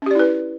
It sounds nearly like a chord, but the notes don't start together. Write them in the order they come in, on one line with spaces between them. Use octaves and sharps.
C#4 G4 D5 E4 B4